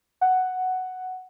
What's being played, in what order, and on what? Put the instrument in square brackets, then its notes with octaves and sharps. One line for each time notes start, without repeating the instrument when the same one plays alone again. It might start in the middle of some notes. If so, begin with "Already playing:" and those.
[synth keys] F#5